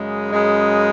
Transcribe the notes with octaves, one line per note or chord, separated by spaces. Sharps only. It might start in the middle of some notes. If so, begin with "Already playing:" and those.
Already playing: F#2 C#3 G#3
F#2 C#3 G#3